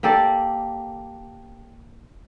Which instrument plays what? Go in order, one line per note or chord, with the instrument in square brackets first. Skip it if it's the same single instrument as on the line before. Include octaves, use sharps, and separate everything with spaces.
[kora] A#3 G4 A4 D5